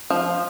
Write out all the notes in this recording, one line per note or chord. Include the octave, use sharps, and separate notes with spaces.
F3